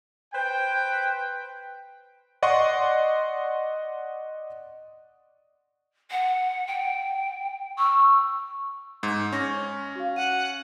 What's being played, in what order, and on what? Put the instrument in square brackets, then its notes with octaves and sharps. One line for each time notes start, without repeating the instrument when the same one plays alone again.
[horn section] B4 C5 G5
[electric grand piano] D5 D#5 F#5 C6 C#6
[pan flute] F#5
G5
[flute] C#6 [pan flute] E6
[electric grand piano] G#2
[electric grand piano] C#4 [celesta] C#6 A#6
[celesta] F#4 F5
[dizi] F#5 [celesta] D#7